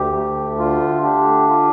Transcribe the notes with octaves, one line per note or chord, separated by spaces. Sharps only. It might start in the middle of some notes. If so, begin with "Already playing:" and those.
Already playing: D2 G4
A3
D3 F4
D4 G4
F4